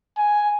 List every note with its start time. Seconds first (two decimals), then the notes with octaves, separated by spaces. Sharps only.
0.18 G#5